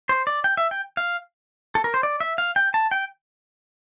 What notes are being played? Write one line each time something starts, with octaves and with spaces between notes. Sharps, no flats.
C5
D5
G5
E5
G5
F5
A4
A#4
C5
D5
E5
F5
G5
A5
G5